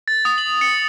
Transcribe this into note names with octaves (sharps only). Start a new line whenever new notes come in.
A6
D#6
F#7
C#7